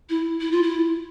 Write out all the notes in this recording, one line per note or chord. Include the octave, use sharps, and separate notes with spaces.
E4
E4
F4
E4